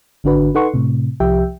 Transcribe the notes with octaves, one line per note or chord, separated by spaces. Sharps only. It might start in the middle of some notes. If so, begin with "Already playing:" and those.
G#1 D3 D4 F#4 B4
D#4 A4 B4 F#5 C6 C#6
A2 C3
C2 F3 G4 E5 G5